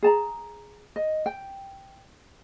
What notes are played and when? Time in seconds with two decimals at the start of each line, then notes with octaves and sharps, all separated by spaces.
0.03 G#4 A5 A#5
0.96 D#5
1.26 G5